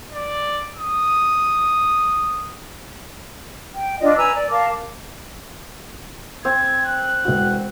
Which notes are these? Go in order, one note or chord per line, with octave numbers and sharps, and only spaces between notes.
D5
D#6
G5
D4 F4 D5 D#5
B4 G#5 A#5 E6
D5
A#4 F5 A5 D6
C4 G#6
F#6
E1 F#4